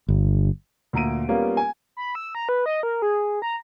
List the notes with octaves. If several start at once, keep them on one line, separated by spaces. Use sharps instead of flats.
G1
D2 A#2 A#5 D7 D#7
G3 A#3 B3 C#4 F4
G#5
B5
E6
A#5
B4
D#5
A#4
G#4
A#5